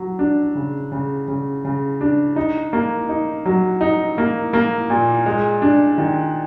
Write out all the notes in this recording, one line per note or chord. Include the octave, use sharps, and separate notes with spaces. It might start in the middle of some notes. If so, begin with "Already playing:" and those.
Already playing: F#3
D4
C#3
C#3
C#3
C#3
D4
D#4
A#3
D#4
F#3
D#4
A#3
A#3
A#2
G#3
D4
D#3